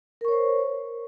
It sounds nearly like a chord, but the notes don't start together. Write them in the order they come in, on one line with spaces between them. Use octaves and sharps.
A#4 C#6 C#5 C5